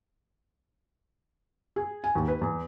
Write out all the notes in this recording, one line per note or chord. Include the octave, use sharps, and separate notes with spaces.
G#4
G#5
D#2
B4
E2